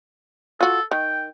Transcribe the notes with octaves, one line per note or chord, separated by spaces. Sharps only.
F4 F#4 A4
D#3 G5